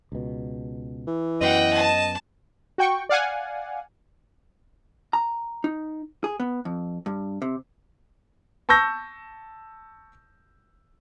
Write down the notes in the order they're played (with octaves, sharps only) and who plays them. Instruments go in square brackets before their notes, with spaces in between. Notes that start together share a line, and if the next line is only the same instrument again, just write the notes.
[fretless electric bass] C#2 B2
[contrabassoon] E3
[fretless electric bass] F#2 F#3 B3 [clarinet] D#5 [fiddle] F#5 G5
[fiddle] A5
[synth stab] F#4 G5 C#6
D5 F5 F#5 G#5
[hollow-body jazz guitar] A#5
D#4
G#4
B3
F2
G2
C3
[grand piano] A5 C#6 E6 G6 A#6